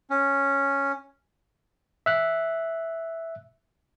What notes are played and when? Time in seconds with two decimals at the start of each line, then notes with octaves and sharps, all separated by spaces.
0.10 C#4
2.06 E5 F#6